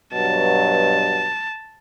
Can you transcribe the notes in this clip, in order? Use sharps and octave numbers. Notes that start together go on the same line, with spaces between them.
G2 B2 F#3 A5